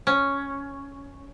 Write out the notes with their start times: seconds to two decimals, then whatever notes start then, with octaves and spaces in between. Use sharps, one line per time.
0.07 C#4